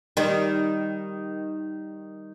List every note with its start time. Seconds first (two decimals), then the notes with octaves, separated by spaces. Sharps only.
0.17 D#3 G3